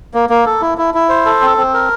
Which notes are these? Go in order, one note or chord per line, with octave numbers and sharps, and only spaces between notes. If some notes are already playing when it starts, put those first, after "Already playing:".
A#3
A#3
A4
E4
E4
E4
C5
A4
C4
C4
A#4